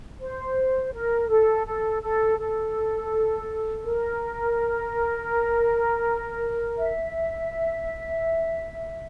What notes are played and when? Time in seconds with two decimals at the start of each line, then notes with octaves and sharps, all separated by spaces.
0.20 C5
0.92 A#4
1.29 A4
1.66 A4
2.02 A4
2.38 A4
3.84 A#4
6.76 E5